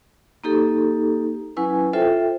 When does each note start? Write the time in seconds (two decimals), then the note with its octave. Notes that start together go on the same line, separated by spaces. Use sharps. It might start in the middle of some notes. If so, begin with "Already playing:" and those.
0.44 A#3 D#4 G4 A4
1.57 F#3 C#4 E4 B4 G#5
1.93 F4 A4 C5 E5 G5